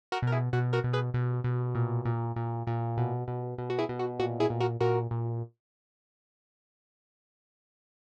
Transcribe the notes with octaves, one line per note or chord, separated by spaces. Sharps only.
F#4 A#4
B2
A#4
E4 G#4
B2 F#4
F#4 A#4
B2
G#4 B4
B2
B2
A#2
A#2
A#2
A#2
B2
B2
B2
F#4
E4 G#4
B2
F#4
A#2 F#4
E4 G#4
A#2
F#4 A#4
A#2 F#4 A#4
A#2